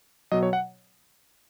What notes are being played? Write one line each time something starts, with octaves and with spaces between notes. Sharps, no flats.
B2 F#3 D#5
C#5
F#5